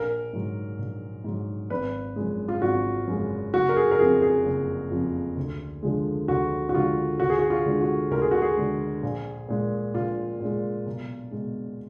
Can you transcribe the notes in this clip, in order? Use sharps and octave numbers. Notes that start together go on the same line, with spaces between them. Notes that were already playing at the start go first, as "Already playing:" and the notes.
Already playing: A#1 A#4
G#2 F#3
A#1
G#2 F#3
G#1 B4
F#2 F3 G#3
F4
G#1 F#4
F#2 F3 G#3
F#1 F#4
A#4
G#4
A#4
F2 F3 G#4
G#4
F#1
F2 F3
D2
D3 F3 G#3
D2 F#4
F#4
D3 F3 G#3 F4
D2 F#4
G#4
F#4
F4
D3 G#3
F#4
D2 A#4
G#4
F#4
G#4
D3 G#3
A#1
A#2 G#3
A#1 F4
A#2 G#3
B1
B2 G#3